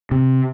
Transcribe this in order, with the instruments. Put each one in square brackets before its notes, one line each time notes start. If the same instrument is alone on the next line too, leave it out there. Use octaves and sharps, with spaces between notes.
[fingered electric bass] C3